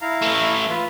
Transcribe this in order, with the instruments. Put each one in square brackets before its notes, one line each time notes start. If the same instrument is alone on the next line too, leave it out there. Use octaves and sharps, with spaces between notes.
[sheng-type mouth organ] E4 F5 A#5
[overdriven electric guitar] E3 A3
[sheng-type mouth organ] F4 B4